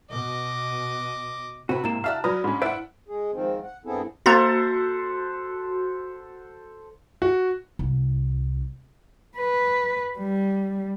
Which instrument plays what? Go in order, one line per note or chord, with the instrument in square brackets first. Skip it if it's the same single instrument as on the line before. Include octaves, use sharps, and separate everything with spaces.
[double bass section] B2 [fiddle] D#5 D6
[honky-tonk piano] C3 C4 [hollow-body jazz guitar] F#4 B4
[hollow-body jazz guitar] G#2 A#3 [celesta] E4 A#5 E7
[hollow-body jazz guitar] F#4 E5 F5 [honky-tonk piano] D5 A5 F6
[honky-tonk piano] F#3 B4 [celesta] F#4 D5 D#6 [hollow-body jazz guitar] A#5
[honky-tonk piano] G#2 C#4 [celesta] B5
[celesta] E4 D7 [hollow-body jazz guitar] B4 C5 D5 [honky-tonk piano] E5 F#5
[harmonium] G#3 G#4
G#2 D#3 F3 C4
F#5
G2 B3 C4 E4 G#4 A4
[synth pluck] A#3 A#5 A6 [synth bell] F#4 [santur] A4 C5 F#5
[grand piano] F#4
[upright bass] C2
[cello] B4
G3